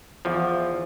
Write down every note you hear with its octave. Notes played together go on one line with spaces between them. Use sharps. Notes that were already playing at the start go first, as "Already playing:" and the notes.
E2 F3